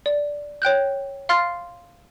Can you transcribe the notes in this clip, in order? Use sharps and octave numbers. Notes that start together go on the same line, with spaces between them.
D5
C#5 G5 F#6 G6
F5 C6 F6 A6 C7